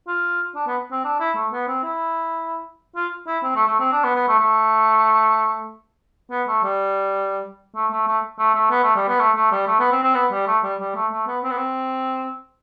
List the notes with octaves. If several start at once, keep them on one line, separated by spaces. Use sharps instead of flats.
F4
D4
B3
C4
D4
E4
A3
B3
C4
E4
F4
E4
C4
A3
A3
C4
D4
B3
B3
A3
A3
B3
A3
G3
A3
A3
A3
A3
A3
B3
A3
G3
B3
A3
A3
G3
A3
B3
C4
C4
B3
G3
A3
G3
G3
A3
A3
B3
C4
B3
C4